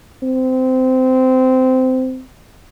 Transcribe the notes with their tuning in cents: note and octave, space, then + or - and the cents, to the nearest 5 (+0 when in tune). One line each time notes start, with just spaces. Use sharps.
C4 -20